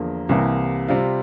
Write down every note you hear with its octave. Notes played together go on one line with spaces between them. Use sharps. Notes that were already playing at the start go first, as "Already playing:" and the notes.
Already playing: E2 D3 F3 A#3
C2 C3 E3 A#3
C3 G3 C4 F4